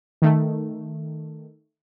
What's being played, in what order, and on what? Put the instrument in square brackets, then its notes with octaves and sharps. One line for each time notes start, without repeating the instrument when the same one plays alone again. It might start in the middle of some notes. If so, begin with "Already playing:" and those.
[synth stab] D#3 A3